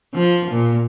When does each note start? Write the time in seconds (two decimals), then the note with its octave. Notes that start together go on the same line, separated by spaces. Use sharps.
0.14 F3
0.51 A#2